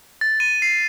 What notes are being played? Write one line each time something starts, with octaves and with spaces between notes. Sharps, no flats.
A6
D#7
C7